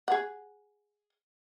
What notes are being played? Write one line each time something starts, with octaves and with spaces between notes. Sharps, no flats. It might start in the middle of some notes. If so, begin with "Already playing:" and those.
G#4 F#5